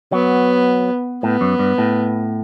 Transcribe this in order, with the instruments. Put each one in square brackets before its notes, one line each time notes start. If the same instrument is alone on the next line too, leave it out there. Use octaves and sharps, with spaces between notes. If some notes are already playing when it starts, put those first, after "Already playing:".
[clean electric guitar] F#3 [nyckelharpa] B3
[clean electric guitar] A2 [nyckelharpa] B3
[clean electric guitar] F#2
G2
A2